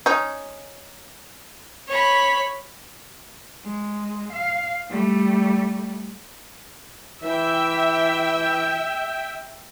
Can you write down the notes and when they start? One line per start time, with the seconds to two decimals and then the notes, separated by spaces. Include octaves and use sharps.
0.06 C#4 D#4
1.88 C#5 B5
3.64 G#3
4.33 F5
4.90 G3 A3
7.24 E3 E5 G5